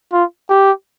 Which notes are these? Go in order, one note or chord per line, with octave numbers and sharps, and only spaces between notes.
F4
G4